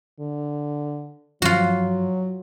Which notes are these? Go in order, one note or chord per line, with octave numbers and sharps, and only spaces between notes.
D3
G2 F3 F#3 F4 F#4